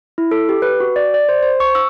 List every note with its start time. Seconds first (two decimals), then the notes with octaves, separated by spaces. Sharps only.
0.18 E4
0.31 A4
0.49 G4
0.62 B4
0.80 F#4
0.96 D5
1.14 D5
1.29 C5
1.42 C5
1.60 C#6
1.75 E6